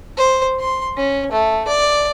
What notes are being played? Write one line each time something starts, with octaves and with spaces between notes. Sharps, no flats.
C5
C6
C#4
A3
D5